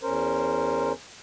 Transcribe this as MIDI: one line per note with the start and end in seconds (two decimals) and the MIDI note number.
0.03 0.92 40
0.03 0.92 61
0.03 0.92 70
0.03 0.92 72